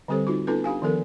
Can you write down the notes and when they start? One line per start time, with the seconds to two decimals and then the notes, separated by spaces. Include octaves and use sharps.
0.08 D3 G3 C4 G4 A4 C5
0.27 D#4 F4 F#4
0.47 B3 C#4 D#4 F4 A4 B4
0.64 D4 G4 F5 G#5
0.82 D#3 F3 B3 A4 A#4